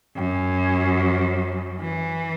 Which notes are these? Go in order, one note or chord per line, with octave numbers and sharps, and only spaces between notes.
F#2
E3